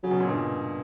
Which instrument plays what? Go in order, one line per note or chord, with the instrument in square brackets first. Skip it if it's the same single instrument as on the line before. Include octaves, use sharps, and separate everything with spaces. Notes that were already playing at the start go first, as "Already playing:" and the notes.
[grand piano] C#3 [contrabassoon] F#3
[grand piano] B2
A#2
G2 B2